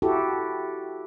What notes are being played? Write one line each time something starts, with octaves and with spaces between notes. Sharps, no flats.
E4 F#4 G4 A4